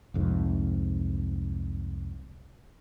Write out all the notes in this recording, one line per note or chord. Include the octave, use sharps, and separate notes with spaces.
C2 F2 G#2